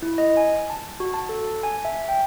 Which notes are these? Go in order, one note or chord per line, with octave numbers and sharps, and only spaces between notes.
E4
D#5
G#5
A5
F#4
A5
A4
A5
G#5
E5
G5